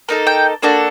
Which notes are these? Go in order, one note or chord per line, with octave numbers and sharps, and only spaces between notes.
A#3 D#4 A4
G5
A#3 D4 F#4 A4 D5